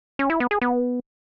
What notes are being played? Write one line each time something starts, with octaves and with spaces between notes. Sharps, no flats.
C#4
E4
B3
G#4
B3